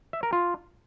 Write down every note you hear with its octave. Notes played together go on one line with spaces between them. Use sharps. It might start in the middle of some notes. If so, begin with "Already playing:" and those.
E5
A#4
F4